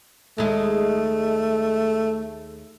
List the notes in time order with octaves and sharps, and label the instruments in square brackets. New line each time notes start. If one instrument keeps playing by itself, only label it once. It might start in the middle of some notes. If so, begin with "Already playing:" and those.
[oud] D#2 G#3 [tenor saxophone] A3